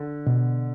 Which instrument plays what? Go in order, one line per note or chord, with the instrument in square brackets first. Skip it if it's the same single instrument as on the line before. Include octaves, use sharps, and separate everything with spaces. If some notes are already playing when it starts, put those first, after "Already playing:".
Already playing: [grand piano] D3
[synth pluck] B2